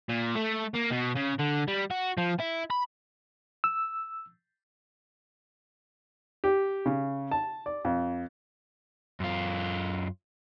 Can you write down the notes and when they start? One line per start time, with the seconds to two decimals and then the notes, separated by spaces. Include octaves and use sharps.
0.09 A#2
0.35 A3
0.74 A#3
0.91 B2
1.15 C#3
1.39 D3
1.68 G3
1.91 F#4
2.18 F3
2.40 E4
2.70 B5
3.64 E6
6.44 G4
6.86 C#3
7.31 A5
7.66 D5
7.85 F2
9.20 F#2 F4